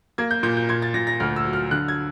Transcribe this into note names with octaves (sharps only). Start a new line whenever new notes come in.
A#3 G#6
G6
A#2 G6
G6
A#2 G#6
A6
A#2 A#6
A#6
D2 F6
E6
F#3
F6
D3 F#6
G#6